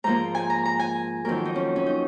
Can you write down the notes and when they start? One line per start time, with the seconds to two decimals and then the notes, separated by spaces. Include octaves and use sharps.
0.04 G#2 F3 A#3 A#5
0.35 G#5
0.50 A#5
0.65 A#5
0.79 G#5
1.25 F2 D#3 F#3 A#3 A#4
1.45 D#4
1.56 C#4
1.76 C#4
1.86 D#4